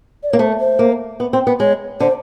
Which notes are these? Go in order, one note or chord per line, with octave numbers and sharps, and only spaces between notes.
D5
A#3 C#5
A3 C5
C5
A#3
B3
C4
B3
G#3 C#5
D3 C5